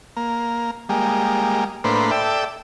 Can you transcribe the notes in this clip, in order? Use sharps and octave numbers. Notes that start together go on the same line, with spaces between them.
A#3
G3 G#3 A#3
A2 A#3 D4 B4 C5
A4 D5 E5 G5